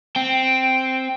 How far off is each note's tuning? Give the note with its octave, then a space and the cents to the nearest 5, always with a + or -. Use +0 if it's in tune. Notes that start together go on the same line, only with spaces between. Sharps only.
C4 +0 G5 +0